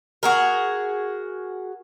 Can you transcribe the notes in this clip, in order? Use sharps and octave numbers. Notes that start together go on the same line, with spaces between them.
F#4 G#4 A#4